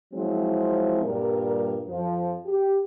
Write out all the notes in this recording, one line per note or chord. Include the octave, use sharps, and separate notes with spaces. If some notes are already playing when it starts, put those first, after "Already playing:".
F3 F#3 G#3 C4 E4
G2 A#2 G3 A#4
F2 F3
G4